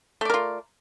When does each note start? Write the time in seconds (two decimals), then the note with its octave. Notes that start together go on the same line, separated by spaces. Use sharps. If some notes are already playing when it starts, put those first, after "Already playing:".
0.21 A3
0.25 D5
0.30 A#4
0.34 F4